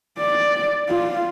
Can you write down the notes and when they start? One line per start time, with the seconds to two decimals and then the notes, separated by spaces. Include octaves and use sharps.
0.18 D5
0.89 F4